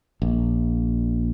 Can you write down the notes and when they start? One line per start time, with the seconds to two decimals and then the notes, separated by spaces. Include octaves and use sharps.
0.22 A#1